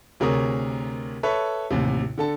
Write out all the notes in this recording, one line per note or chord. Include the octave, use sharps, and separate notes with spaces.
D2 C3 G#4 A#4 C#5 D#6
A4 B4 C#5 E5
A1 D#2 C3
D3 A4 A5